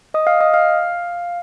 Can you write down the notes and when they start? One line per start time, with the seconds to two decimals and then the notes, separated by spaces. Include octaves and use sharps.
0.14 D#5 D#6
0.27 F5 F6
0.41 D#5 D#6
0.54 F5 F6